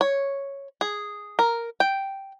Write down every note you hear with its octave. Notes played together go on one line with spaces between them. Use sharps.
C#5
G#4
A#4
G5